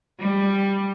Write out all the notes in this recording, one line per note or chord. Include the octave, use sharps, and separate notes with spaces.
G3